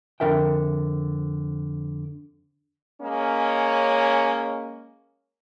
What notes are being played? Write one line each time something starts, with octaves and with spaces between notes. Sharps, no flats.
F2 D3 A#4 E5 G5
G#3 A#3 C#4